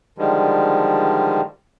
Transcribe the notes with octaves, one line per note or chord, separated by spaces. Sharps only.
D3 D#3 F3 G3 G#3